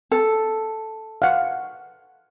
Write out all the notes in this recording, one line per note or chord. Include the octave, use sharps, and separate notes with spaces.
A4
F5 F#5